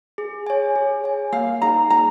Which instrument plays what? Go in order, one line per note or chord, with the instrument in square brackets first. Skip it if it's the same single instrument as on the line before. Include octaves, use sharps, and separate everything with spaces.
[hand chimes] G#4
C#5 G#5
G#4
C#5 G#5
[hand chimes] A#3 [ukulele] F5
[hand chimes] D#4 G#4 C#5 [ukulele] A#5
[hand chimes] A#3 [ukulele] A#5